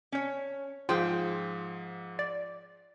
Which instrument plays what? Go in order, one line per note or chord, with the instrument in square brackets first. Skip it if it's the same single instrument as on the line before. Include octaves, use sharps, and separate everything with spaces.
[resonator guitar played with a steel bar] C#4 C#5
[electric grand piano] G#2 F3 [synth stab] F4 [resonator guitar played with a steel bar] G#4 C5 G5
[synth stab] D5